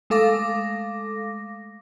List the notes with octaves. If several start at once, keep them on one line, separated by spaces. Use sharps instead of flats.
G#3 A3 A4 F5 D6 A#6